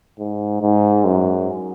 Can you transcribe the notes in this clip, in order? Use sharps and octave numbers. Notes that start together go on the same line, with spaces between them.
G#2
G#2
F#2